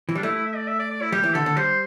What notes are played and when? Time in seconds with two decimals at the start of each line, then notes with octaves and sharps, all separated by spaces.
0.09 E3
0.15 G3 D4
0.23 A3 E4
0.34 E4
0.46 E5
0.56 D5
0.67 E5
0.79 D5
0.90 D5
1.01 E4
1.12 G3 G4
1.24 E3
1.34 D3 A4
1.46 D3
1.56 G3 C5